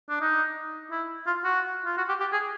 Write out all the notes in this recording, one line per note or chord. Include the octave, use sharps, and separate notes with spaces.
D4
D#4
E4
F4
F#4
F4
F#4
G4
G4
G#4